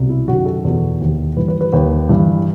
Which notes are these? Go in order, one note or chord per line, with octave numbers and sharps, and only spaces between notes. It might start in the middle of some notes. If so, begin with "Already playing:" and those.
Already playing: C2 B2
E4
F#2 D#3 F#4
A4
E2 B2
D#2 D#3
G2 E3 B4
B4
B4
D#2 D#3 B4
G2 E3